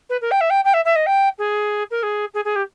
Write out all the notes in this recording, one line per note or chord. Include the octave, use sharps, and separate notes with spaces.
B4
A#4
G5
E5
G5
G5
E5
E5
D#5
G5
G#4
A#4
G#4
G#4
G#4
G4